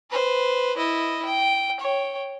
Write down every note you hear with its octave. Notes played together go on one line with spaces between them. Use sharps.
B4 C5
E4 D#5
G5
C#5 G5